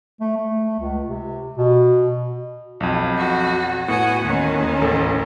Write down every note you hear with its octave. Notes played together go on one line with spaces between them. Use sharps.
A3
A3
C#2
C3
B2
B1 F2
F#4
A2 B3 F#4 F#5 G#5
D#2 D#3 C#4
A1 A4